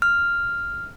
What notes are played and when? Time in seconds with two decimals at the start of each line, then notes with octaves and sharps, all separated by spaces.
0.02 F6